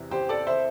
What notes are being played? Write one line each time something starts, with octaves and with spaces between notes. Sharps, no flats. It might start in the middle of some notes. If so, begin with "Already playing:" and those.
Already playing: E2 C3 E3
G4 C5
A4 D5
C5 E5